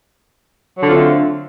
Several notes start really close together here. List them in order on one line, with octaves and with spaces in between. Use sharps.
F#3 D3 F4 C4 A3